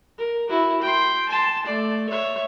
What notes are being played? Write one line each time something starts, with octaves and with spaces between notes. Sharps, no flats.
A#4
E4 F#4
G5 C6
A5 C6
A3 D5
C#5 E5